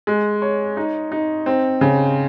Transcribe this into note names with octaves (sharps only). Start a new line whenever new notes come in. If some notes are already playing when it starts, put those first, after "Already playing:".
G#3
C#5
D#4
D#4
C4
C#3